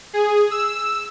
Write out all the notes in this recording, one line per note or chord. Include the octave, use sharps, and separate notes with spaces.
G#4
E6